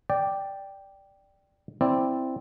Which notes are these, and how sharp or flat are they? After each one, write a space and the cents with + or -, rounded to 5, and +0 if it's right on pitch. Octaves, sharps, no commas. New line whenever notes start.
D5 +0 G5 +0
C4 +0 E4 +0 D5 +0